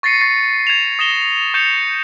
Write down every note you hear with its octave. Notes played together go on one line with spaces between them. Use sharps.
C#6 A6 A#6 C7 C#7 D#7
C#6 A6 C7
G#6 E7 F7
D#6 A#6 E7 G7
C#6 G6 A6 C#7 E7 F7